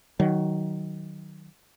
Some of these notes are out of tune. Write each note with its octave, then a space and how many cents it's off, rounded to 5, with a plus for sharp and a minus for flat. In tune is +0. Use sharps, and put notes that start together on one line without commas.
D#3 +0 F#3 +15